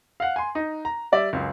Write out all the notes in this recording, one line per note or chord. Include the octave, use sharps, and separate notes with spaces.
F5 F#5
G#5 C6
D#4
A#5
G3 D5 E5
C#2 F#2